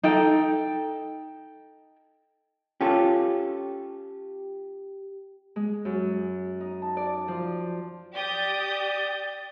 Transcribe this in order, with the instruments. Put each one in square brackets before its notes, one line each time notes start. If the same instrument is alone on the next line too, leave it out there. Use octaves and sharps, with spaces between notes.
[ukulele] D#4 A4 G5
[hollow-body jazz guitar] C#4 F4 A4 [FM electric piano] G4
[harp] G#3
F#2
D#4
A5
D5
F3
[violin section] G4 D#6 G6 [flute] D5